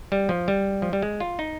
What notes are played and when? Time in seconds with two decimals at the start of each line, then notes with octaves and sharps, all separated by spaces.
0.12 G3
0.29 F3
0.48 G3
0.82 F3
0.93 G3
1.02 G#3
1.20 F4
1.39 D#4